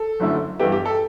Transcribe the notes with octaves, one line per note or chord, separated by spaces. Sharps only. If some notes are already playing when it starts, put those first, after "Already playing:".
Already playing: A4
F#1 F#2 D3 A3 E4
G2 E3 B3 E4 G4
G4
A4